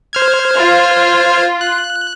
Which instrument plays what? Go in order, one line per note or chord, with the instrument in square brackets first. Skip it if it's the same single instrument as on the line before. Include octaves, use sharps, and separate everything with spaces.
[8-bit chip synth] C5 F6 G#6
[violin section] F4
[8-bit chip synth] F#6